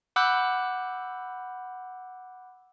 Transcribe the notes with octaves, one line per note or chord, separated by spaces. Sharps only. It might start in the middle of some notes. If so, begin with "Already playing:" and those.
F#5 B5 D6 E6 F#6 G6